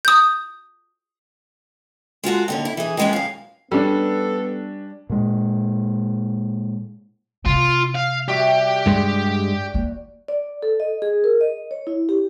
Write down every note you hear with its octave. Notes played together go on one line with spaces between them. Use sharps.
D#6 G6
G#3 F4 F#4 A4
D#2 D3 C#4
E4
E3 G#4
D#3 E3 G#3 B3 C#4
F#2 F5
G3 B3 C#4 D4 A4
A#2 G#3
C3 F4
F5
G3 F#4 G4 E5
G2 G#3
A#3
D5
A4
D#5
G#4
A#4
D#5
C#5
E4
G4